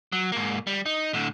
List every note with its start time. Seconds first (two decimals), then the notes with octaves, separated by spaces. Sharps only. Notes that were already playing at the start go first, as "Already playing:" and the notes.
0.12 F#3
0.32 G#2 A#3
0.67 G3
0.86 D#4
1.13 A2 D3